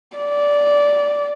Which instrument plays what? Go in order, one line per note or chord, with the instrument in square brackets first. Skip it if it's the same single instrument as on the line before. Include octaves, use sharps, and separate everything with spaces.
[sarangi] D5